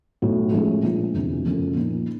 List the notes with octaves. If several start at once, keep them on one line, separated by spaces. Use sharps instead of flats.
B1 A2 F#3
A2 F3 G#3 C#4
A#1 A#2 F3 G#3
E1 D2 C3 E3
F#1 F#2 C#3 F3 A3
A#2 F3 A#3 D#4